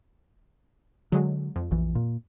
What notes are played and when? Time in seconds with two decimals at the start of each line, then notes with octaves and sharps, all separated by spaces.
1.12 D3 F#3 G#3
1.56 F2
1.71 A#1 E3
1.95 A#2